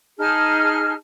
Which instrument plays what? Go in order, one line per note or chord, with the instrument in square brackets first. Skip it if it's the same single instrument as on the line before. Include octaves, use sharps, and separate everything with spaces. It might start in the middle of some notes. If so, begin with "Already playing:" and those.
[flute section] D#4 G#4 A5 F6